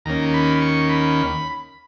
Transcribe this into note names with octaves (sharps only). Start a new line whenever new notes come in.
D#2 D#3 A#3 C#4 A#5
B5
C#6
B5